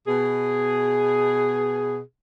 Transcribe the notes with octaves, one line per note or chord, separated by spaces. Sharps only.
B2 G#4